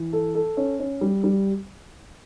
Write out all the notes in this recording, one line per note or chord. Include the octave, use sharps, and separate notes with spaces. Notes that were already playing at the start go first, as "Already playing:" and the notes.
Already playing: E3
A4
A4
C#4
C#4
G3
G3